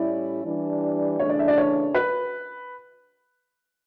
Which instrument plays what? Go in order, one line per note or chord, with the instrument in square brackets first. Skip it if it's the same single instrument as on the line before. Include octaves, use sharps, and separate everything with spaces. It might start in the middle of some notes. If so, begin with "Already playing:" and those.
Already playing: [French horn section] A2 G3 C#4 E4 [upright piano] D5
[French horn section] E3 G3 D4
[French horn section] C#3 E3 A3 D4 [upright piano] C#5
[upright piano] D5
E5
D5
C#5
B4